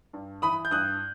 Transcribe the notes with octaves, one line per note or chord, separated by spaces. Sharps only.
G2
E3 B5 D#6
G6
G2 D#6 F#6